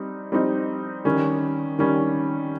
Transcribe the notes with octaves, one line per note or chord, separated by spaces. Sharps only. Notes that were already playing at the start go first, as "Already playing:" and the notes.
Already playing: G3 C4 D#4
G3 C4 D#4
D#3 G3 C#4
D#3 G3 C#4